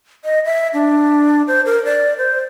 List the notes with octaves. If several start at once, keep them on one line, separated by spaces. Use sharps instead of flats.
D#5
E5
D4
C5
A#4
D5
C5